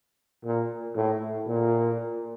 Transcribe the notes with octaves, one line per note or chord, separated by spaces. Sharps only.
A#2
A2
A#2